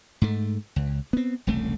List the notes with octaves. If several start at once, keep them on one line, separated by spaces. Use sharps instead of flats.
G#2 A3
C#2
B3 C4
E1 C2 C#3 A3